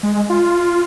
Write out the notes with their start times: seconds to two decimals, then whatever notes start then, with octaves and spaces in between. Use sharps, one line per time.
0.03 G#3
0.30 F4